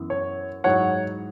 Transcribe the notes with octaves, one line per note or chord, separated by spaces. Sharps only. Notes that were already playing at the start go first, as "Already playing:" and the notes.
Already playing: F#2 E3 B3
C#5
G#2 F#3 E4 C#5 F#5